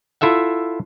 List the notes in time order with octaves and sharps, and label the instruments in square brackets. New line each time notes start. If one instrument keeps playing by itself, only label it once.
[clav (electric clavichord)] E4 F4 A4 E5 F#5